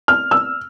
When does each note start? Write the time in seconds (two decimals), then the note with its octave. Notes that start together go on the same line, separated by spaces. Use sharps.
0.08 F6
0.31 E6